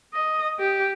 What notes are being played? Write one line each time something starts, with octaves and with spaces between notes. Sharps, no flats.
D#5
G4